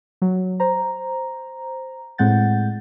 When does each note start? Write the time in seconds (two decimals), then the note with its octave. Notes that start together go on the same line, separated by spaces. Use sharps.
0.22 F#3
0.60 C5 A#5
2.18 A2 G#3 C4 F#5 G6 A6